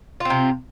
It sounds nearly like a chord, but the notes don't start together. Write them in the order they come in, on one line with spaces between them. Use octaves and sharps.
F4 C4 C3